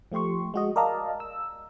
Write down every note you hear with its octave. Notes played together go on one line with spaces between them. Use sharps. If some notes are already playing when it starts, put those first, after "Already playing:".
F3 A3 G4 C6 C#6
G#3 F#4 D#5
A#4 D5 D#5 F5 A5 A#5
E6